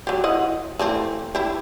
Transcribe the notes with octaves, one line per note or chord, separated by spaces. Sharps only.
F#3 G4
E4 D#5 F#5
E3 A3 C4
E4 G4